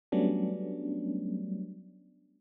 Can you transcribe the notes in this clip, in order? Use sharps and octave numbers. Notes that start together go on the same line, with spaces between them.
F#3 G3 A3 B3 C#4 D4